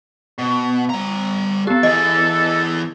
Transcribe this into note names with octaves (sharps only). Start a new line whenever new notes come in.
B2
G3 A#5
B3 G4 A4
E3 G#4 D#5